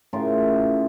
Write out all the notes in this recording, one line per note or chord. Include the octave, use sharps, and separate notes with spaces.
A2 C#3 F4 A#4